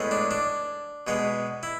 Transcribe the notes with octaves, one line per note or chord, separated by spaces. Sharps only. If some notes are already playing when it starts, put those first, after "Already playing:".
Already playing: A2 G#3 B3
D4
D4
B2 G#3 B3
E4